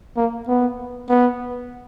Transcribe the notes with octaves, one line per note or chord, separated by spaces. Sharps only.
A#3
B3
B3